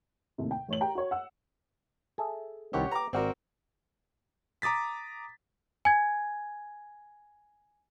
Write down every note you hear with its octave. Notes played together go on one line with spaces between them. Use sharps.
D#2 A2 C3
G5
A1 C#5 F#7
G4 G5 A#5
F#4 C#5
F#5 E6
G#4 A4 E5
C2 D#3 C4 G4 C#5 F#5
B4 G5 A#5 D6
G#1 C4 F#4 A#4 D5
A#5 D6 D#6 A6 B6
G#5 G#6